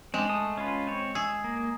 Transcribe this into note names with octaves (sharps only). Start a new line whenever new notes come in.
G#3 C4 D4
A3 A5 D#6
C#4 F4 B4
C4 C#5
G#4 E6
A#3